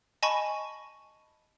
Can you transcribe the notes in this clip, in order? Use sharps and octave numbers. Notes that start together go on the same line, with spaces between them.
D#5 G#5 A5 B5 C#6